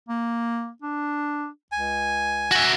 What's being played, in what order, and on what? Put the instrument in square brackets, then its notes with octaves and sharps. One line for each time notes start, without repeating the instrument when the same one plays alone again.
[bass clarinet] A#3
D4
[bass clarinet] C#2 [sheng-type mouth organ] G#5
[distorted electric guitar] F#4 E5